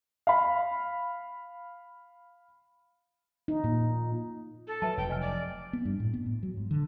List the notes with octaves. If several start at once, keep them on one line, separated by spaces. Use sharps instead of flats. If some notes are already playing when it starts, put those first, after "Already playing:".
F5 B5
D#4
A#2
A4
F#3 B4 E5 A5
F1 F#3 G5
D#5 G#5 F6
D5
B3
G2
A2
B3
A2
F#3
G#2
D3